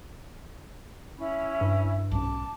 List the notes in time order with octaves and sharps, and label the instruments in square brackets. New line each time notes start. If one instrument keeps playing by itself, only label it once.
[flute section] C#4 E4 B5
[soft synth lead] G2
[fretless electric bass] B1 G#2 C#4 [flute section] A5 D6